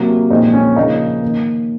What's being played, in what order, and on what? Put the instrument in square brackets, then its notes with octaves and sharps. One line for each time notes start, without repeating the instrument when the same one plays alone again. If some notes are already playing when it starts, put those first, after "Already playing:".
Already playing: [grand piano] C3 F#3 A#3
A#2 F3 G#3 C4 D#4
C#4
C#3 F3 A#3 D#4
D#3 A#3